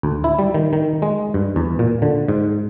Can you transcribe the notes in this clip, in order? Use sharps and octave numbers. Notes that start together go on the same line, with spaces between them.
D2
E4
G3
D#3
D#3
G#3
G2
E2
A#2
D3
G#2